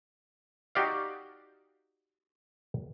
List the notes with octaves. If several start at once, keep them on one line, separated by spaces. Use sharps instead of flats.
D#4 F#4 G4 D5 F5